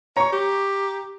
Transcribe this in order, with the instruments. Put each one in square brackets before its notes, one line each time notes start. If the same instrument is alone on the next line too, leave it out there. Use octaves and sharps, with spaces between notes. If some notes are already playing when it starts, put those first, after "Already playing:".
[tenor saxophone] C#5 [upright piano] A#5 C#6
[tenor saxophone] G4